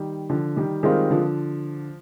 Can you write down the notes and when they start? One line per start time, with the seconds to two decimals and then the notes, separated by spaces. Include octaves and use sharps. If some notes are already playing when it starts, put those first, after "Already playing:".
Already playing: D#3 G3
0.30 D3 F3
0.56 D#3 G3
0.83 D#3 G3 G#3 C4 F4 A#4
1.10 D3 F3